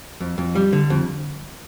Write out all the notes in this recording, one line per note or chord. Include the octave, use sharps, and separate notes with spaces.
F2
F2
G3
D3
F2